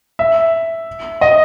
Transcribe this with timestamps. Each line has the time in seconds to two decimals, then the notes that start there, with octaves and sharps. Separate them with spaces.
0.19 E5
1.21 D#5